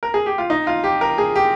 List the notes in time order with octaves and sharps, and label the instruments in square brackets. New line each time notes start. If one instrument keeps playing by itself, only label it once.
[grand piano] A#4
G#4
G4
F4
D#4
F4
G4
A#4
G#4
G4